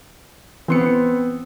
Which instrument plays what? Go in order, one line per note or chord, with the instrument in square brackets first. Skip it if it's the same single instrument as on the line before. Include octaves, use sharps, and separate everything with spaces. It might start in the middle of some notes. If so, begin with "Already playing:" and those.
[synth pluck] E3 C6 C#7 [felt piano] B3 C4